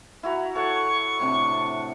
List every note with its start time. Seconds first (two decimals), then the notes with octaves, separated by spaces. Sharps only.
0.23 E4 F#4 A#5
0.55 A4 C#5 F#5 C#6
1.20 A2 C3 D4